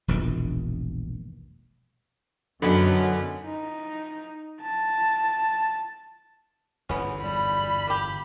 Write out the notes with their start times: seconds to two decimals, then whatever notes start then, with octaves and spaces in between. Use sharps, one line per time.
0.08 E1 A#1 G2 D#3
2.62 F#2 D3 D#3 F#3 B3 C#4 B5
3.45 D#4
4.62 A5
6.89 G1 E2 G#2 B3 C#4
7.23 G3 B5
7.87 A#3 G4